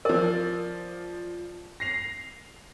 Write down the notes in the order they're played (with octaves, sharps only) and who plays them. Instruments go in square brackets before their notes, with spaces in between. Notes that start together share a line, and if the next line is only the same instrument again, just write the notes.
[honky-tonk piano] F3 D5 [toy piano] A#4
[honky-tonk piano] A#6 C7 F7